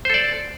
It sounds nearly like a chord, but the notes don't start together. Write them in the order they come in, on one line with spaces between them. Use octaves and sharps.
C5 A4 D5